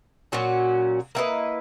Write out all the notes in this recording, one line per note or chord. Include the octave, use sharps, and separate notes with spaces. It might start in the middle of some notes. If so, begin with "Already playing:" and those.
A#2 F#3 C#4 F#4
A#3 E4 B4 D#5